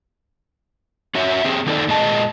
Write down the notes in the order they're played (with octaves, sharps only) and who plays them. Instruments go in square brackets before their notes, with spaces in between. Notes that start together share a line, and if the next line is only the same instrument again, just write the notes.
[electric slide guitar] C#4 F#4 C#5 E5
C4 G4 G#4
D#3 A#3 D#4 A4 D5
A#2 G#3 D#5 A5